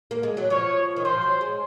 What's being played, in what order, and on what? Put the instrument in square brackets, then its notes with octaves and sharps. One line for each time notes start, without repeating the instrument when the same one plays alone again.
[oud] A#3
G#3
F#3
[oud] F3 [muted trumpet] C#5
[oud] D#3
[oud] F3 [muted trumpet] C5
[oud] F#3
G#3